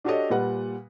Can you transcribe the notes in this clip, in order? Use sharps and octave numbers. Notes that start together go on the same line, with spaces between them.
D4 F#4 G4 A4 C#5 D#5
A#2 G3 B4 F#5